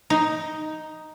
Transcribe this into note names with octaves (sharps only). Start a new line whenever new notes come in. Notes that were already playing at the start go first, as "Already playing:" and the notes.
D#4